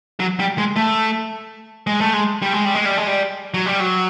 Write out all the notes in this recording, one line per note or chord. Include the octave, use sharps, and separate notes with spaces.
F#3
G3
G#3
A3
G#3
A3
G#3
G3
G#3
G3
G#3
G3
G#3
G3
F#3
G3
F#3